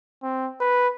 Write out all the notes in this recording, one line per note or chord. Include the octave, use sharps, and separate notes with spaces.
C4
B4